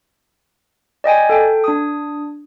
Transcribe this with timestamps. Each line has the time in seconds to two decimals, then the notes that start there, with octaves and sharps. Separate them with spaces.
1.04 D5 D#5 G5 G#5
1.29 A4 G5
1.64 D4 D#6